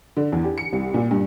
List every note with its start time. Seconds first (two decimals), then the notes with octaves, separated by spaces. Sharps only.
0.17 D3
0.32 E2
0.44 G4
0.58 C#7
0.73 C2
0.94 A#2
1.11 G2